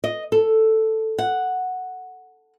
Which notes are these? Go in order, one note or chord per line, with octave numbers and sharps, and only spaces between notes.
D#5
A4
F#5